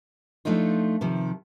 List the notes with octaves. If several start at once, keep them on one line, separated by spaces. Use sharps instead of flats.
F3 A3 D4 D#4 F4
C3 D#3 F3